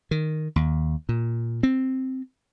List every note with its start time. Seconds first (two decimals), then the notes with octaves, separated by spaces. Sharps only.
0.11 D#3
0.56 D#2
1.09 A#2
1.63 C4